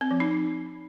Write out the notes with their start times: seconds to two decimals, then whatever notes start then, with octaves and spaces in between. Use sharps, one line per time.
0.01 C4
0.11 F3
0.20 D#4